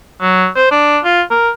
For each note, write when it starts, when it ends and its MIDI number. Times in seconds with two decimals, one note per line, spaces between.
0.21 0.47 54
0.56 0.69 72
0.71 0.99 62
1.05 1.22 65
1.31 1.50 70